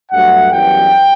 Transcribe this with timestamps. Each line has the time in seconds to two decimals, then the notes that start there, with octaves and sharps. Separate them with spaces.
0.12 G2 F#3 A3 F#5
0.52 F#2 E3 G3 B3 G5